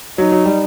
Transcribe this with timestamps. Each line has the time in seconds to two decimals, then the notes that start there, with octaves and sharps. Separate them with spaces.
0.18 F#3 D#4
0.32 F#3
0.45 G3